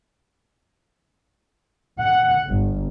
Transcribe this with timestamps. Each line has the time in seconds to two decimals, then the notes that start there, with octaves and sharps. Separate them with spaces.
1.98 F#5
2.46 G1